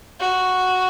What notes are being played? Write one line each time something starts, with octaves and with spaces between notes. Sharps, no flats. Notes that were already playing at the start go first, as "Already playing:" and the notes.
F#4